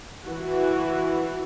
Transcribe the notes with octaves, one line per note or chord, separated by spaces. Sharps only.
E3 F#4